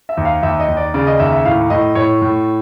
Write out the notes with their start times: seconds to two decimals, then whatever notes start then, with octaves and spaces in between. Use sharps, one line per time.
0.09 E5
0.17 D#2
0.25 F5
0.42 D#2 E5
0.60 D#5
0.68 D#2
0.77 D5
0.94 C#3 D5
1.07 D#5
1.19 D#2 E5
1.32 E5
1.45 A2 F5
1.70 A2 D#5
1.95 A2 C#5
2.22 A2